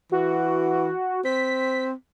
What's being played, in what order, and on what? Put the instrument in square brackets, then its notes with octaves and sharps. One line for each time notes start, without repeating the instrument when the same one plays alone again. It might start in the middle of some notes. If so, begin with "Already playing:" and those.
[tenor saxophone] E3 [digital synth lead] F#4
[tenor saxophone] C4 [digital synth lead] B6